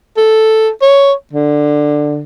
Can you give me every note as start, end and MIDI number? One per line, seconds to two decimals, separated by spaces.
0.17 0.69 69
0.82 1.13 73
1.33 2.23 50